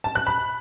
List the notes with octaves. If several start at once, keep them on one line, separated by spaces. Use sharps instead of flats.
A5
F#6
B5